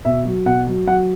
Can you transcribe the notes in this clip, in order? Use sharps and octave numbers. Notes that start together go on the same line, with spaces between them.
B2 E5
F#3
B2 F#5
F#3
F#3 F#5